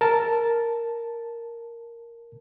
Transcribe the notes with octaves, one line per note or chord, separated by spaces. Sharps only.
A#4 A5